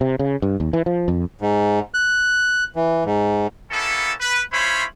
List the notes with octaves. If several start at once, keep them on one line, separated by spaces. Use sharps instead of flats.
C3
C#3
G2
D#2
E3
F3
F2
G#2
F#6
E3
G#2
A#3 B3 C#4 E4 A4
B4
C#4 E4 F4 C5 C#5 B5